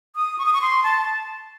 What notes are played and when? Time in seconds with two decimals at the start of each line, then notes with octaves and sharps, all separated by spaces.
0.16 D#6
0.38 C#6
0.46 D#6
0.53 C#6
0.62 C6
0.84 A5